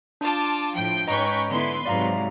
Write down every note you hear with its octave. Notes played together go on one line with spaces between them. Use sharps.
D4 F4 A5 D6
A2 F3 G5 D7
G#2 C#4 B4 D#5 G5 A#5 C#6 D7
D3 B3 E4 B4 C6
G#2 C3 F#3 D5 F5 A#5